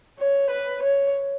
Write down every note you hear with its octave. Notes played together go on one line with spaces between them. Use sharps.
C#5
B4
C#5